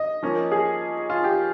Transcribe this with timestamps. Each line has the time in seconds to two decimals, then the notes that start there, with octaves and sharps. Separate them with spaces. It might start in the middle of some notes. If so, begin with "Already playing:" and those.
Already playing: D#5
0.23 F3 A#3 C#4
0.52 G#4
1.10 F4
1.24 G4